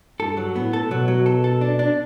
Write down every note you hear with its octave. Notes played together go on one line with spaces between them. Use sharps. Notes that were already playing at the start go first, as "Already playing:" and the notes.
G2 A4
F#3
A2 B3
A4
B2 F#3
F#3
A4
A4
D4
D4